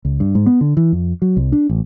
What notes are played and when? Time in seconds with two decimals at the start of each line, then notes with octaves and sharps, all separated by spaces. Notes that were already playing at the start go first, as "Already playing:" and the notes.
0.05 C#2
0.20 G2
0.35 G#2
0.46 B3
0.61 D3
0.77 E3
0.92 F2
1.22 F#3
1.37 C2
1.52 D4
1.69 A1